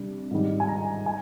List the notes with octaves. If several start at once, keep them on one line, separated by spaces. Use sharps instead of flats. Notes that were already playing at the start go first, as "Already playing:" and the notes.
Already playing: C3 G3 D4
G#2 D#3 G3
G#5
A#5
G#5